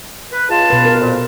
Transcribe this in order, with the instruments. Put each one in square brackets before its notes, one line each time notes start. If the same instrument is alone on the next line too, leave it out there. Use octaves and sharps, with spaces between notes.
[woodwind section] B4
C#2 F4 A5
[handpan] B2 B4
A#4
[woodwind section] F2 A#2